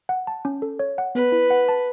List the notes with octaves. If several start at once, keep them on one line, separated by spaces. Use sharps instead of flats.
F#5
A5
C#4
A4
C#5
F#5
B3 B4
E4
F#5
A5